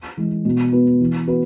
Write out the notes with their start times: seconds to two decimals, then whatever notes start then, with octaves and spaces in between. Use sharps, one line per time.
0.17 E3 G#3
0.45 B2
0.72 B3 F#4 B4
1.01 E3
1.27 B3 F#4 B4